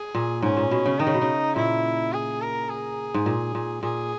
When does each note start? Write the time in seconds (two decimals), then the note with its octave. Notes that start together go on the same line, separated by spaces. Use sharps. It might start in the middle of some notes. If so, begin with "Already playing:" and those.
Already playing: G#4
0.15 A#2
0.42 G#2 C#4
0.57 A#2
0.71 B2
0.86 C#3
1.00 D#3 D#4
1.07 C#3
1.14 B2
1.21 C#3
1.56 A#2 E4
2.13 G#4
2.41 A#4
2.69 G#4
3.14 G#2
3.26 A#2
3.55 A#2
3.83 A#2 G#4